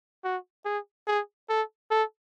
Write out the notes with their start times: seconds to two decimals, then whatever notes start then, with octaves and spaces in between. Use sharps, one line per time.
0.24 F#4
0.65 G#4
1.07 G#4
1.49 A4
1.91 A4